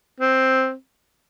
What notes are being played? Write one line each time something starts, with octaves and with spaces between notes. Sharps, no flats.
C4